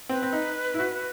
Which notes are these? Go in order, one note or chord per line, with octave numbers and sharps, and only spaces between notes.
C4 B4
C4
D#4
E4
F#4